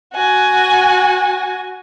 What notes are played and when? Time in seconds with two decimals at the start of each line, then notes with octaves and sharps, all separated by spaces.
0.14 F#4 G#5